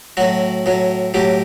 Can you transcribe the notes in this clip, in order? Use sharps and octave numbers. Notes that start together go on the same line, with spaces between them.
A2 F#3 F#4
A2 F#3
A2 F#3 G4